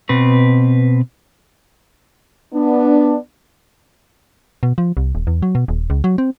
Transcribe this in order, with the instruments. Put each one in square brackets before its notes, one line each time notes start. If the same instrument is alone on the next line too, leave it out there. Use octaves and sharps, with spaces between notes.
[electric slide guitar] B2 C4 B4
[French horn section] B3 D4
[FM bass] B2
F3
C2
D#1
E2
F#3
B2
D#1
C#2
F#3
C4